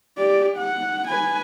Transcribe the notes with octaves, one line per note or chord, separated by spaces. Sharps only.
G4 D5
F#5
B4 G#5